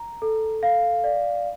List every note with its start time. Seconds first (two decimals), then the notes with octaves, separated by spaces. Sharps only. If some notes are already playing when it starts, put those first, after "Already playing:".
Already playing: A#5
0.22 A4
0.63 F5
1.04 D5